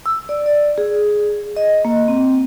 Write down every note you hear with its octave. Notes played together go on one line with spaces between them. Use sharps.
E6
D5
D5
G#4
D#5
A#3
C4